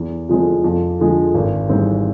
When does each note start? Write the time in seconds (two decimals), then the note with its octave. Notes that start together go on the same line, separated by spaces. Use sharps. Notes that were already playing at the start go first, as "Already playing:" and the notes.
Already playing: E2
0.29 C3 F3 G#3 C4
0.64 F2
0.99 D3 F3 G#3
1.34 G#1
1.69 G#2 E3 G3 C4